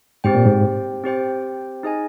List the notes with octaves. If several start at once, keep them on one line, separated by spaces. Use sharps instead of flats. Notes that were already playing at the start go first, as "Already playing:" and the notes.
G#2 C4 G4 C5 G5
A#2
G#2
C4 G4 C5 G5
D#4 G#4 D#5 G#5